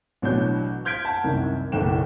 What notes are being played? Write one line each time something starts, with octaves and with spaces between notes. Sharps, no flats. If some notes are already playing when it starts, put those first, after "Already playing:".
A1 B2 F#3 D4 F#4 G6
F6 G6 G#6 B6 D7
F#5 A5
C2 F#2 C3 D#3
F#1 B1 E2 G5 E7